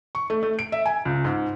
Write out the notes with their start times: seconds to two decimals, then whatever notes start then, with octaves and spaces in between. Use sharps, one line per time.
0.15 C#6
0.30 A3
0.43 A3
0.59 D7
0.72 E5
0.86 G#5
1.05 C#2
1.25 G#2